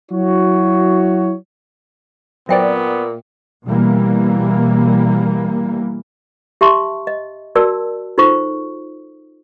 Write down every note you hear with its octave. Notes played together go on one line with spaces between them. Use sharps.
F#3 E4 F#4 C#5
A#2 F#3 B3 C4 D5 E5 G5
B2 E3 G3 A#3
G4 E5 A5 C6 C#6
D#5
F#4 A#4 D5 A5 E6
D#4 F4 A4 C5 C#6